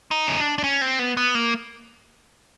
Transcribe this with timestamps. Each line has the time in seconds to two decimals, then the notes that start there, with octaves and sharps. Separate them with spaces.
0.11 D#4
0.27 C#4
0.38 D4
0.58 D4
0.64 C#4
0.81 C4
0.99 B3
1.17 B3
1.35 A#3